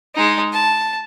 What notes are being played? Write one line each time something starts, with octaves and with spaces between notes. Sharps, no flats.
G#3 D#4
A5